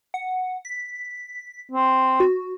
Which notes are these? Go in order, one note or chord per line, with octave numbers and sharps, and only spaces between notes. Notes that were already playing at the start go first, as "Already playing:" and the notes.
F#5
B6
C4
F#4